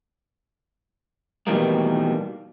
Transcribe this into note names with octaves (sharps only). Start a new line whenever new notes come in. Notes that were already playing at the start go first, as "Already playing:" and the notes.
B2 D#3 E3 G3 A3 A#3